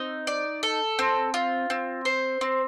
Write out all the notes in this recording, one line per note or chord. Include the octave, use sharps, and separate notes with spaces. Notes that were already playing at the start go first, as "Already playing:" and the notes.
Already playing: C4 D#4
D5
A4
C4
F4
C4
C5
C4